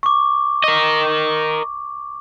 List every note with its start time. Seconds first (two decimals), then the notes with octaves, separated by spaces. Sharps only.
0.03 C#6 D6
0.64 A#4 D#5